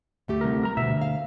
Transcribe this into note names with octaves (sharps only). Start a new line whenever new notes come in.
D2 A3 G4
C2 A#4
A#4 A#5
D2 B2 E5
F5